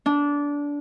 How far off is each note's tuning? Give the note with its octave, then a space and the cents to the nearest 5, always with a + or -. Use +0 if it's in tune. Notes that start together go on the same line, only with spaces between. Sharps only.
D4 -20